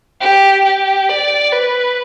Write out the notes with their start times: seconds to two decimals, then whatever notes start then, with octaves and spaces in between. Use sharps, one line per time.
0.21 G4
0.65 G4
1.09 D5
1.52 B4